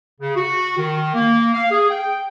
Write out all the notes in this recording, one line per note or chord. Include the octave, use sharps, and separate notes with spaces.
C#3
F#4
D#3
A#3
F5
G#4
G5